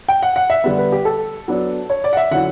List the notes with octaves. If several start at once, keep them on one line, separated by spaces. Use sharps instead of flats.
G5
F#5
F#5
E5
D3 G3 B3
B4
G4
A4
F#3 B3 D4
C#5
D5
F#5
E5
D3 F#3 C#4 E4 F#5